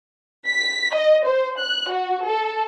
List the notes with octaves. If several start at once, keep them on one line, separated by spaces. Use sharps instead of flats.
B6
D#5
C5
F#6
F#4
A4